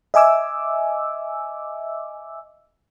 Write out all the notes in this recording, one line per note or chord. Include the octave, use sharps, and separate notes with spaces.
D#5 E5 G#5 D6 E6